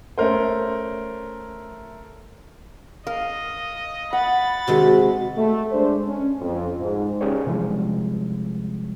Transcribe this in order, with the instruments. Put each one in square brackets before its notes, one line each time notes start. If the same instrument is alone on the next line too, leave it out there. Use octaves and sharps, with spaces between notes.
[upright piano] A3 C#4 A#4 C5
[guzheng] A#4 [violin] D#5 [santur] F5
[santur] F#5 [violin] B5 A6
[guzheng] C3 D#3 G#3 [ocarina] F#4
[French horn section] A3
G#3 D4 C5
C#4
F2
G#2
[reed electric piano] C#4 G4 G#4 A#4 C#5 D5
C3 E3 F3 G3 G#3